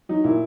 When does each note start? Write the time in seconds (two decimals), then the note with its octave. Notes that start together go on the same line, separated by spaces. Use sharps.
0.09 F#3 D#4
0.24 A#2 E4